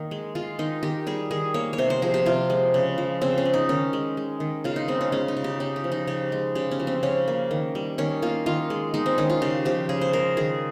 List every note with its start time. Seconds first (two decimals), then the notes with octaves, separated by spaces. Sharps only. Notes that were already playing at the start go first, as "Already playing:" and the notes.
Already playing: D#3 A#3 D#4
0.11 G#3
0.35 G#3 F4
0.59 D#3 D#4
0.83 D#3 G4
1.07 G3 G#4
1.31 D#3 G#4
1.54 A#3 C#5
1.73 C#5
1.78 C3 C5
1.90 C5
2.02 F3 G#4
2.14 G4
2.26 C3 F4
2.50 G#3
2.74 C#3
2.98 F3
3.22 C#3 C4
3.38 C#4
3.45 G#3
3.54 D#4
3.69 D#3 C#4
3.93 G#3
4.17 G#3
4.40 D#3
4.64 C#3 F4
4.76 D#4
4.88 G#3 C4
5.01 C#4
5.12 G#3 C#4
5.28 D#4
5.37 C#3
5.44 G4
5.60 C#3 D#4
5.76 G4
5.84 F3
5.92 D#4
6.07 C#3 G4
6.32 G#3
6.55 C#3 G4
6.71 C#4
6.80 F3
6.87 C4
7.03 C#3 C#4
7.28 A#3
7.51 D#3
7.75 G3
7.98 D#3 C#4
8.22 A#3 F4
8.46 D#3 F4
8.70 G#3
8.94 G#3 D#4
9.06 C4
9.18 D#3 C#4
9.30 F4
9.42 C#3 G4
9.65 F3 G4
9.89 C#3 G#4
10.01 C5
10.13 G#3 A#4
10.37 D#3 G#4